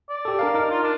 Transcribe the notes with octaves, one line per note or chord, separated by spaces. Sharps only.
D5
G4 A4
D4 A#4 F5
D#4 A#4
F4
D4